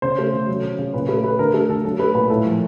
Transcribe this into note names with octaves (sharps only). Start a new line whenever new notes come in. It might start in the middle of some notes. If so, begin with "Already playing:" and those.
C#3 C5
A3
C#3
F#3
C#3
C#3
A#2 B4
A3 B4
A3 B4
D3 A#4
A3 A4
D3 A4
F#3 A4
A3 B4
A#2 B4
A2 A4
F3